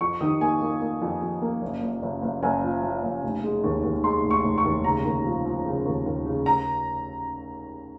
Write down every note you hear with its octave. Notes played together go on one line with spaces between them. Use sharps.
F2 C#6
D#3 D#6
A#3 G#5
A#3
A#3
F2
F2
A#3
F#1
F#1
F#1
F#1
F#1 G#5
F3
F3
F#1
F1
G#3
D#2
D#2
G#3 C6
F1
C#6
F1
C#6
D#2
C#3 A#5
D#2
F3
F3
C#3
D#2
D#2
C#3
A#5